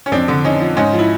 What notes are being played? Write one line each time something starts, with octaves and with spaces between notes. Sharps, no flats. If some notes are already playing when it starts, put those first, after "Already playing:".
C#4
F2 C4 D4
D3
F2 C#4 D#4
F3
G#2 C#4 D#4
F3
E4